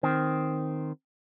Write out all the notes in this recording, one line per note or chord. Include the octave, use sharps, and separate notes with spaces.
D#3 C4